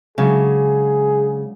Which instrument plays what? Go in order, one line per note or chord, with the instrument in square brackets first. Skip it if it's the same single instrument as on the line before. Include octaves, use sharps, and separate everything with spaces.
[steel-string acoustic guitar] C#3 [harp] F#3 G#3 D4 [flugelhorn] G#4